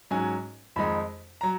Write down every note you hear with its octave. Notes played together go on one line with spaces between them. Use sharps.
G#2 F#3 C#4 G#5
F2 D#3 G#3 D#4 B5
F#3 A#5